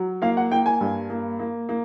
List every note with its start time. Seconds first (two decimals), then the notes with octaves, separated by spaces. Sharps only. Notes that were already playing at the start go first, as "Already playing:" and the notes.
Already playing: F#3
0.22 A#3 F5
0.37 F#5
0.51 A#3 G5
0.66 G#5
0.81 G2
1.10 A#3
1.39 A#3
1.69 A#3